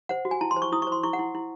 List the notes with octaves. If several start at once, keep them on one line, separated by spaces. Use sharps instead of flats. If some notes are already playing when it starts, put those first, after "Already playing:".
C5 F#5
F#4
G#5
E4 A5
C6
C5
C#6
E4 D#6
C5 C#6
C6
E4 C#6
F#5
E4
E4